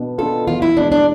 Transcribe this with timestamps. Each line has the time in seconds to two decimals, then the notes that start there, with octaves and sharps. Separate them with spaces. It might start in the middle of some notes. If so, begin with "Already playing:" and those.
Already playing: B2 B3 D4
0.18 B3 D4 F4 A4
0.47 E2 F4
0.62 E4
0.77 B2 G#3 D4
0.92 D4